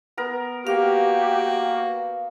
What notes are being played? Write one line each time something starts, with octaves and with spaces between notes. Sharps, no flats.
B3 A#4
A#3 F#4 G4 F5